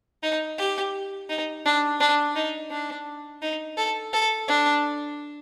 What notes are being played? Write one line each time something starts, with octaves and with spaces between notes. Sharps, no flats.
D#4
G4
D#4
D4
D4
D#4
D4
D#4
A4
A4
D4